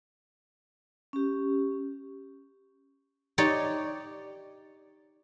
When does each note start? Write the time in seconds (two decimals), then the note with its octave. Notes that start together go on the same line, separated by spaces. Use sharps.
1.13 C#4 G4
3.38 D#4 G4 C#5 D5